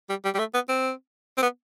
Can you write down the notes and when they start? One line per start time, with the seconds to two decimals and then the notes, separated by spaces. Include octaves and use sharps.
0.10 G3
0.25 G3
0.35 G3
0.39 A3
0.54 B3
0.69 C4
1.38 C4
1.42 B3